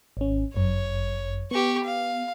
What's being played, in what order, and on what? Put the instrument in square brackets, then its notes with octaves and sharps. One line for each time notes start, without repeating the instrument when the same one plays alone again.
[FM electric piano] G#1 C#4
[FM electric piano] G1 F#2 [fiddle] C#5
[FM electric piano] B3 [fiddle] G4 C#6
[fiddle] F5